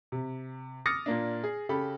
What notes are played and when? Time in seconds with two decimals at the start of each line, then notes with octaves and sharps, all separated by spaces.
0.12 C3
0.86 D6 D#6 F6 A6 A#6 C#7
1.06 A#2 A#3 D4
1.44 G#4
1.69 C#3 G4 A4 B5